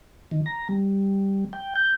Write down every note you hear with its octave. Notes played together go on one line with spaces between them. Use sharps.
D#3
A#5
G3
G5
G6